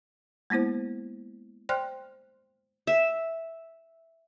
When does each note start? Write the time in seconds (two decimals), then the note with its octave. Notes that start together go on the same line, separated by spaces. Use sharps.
0.50 G#3 A#3 B3 E4 C5
1.69 C5 D5 G5 C6 F6 F#6
2.87 E5